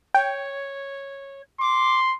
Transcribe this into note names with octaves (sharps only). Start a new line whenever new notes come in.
C#5 G5
C6 D6